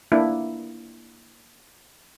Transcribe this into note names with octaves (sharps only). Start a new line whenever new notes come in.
A#3 D4 E4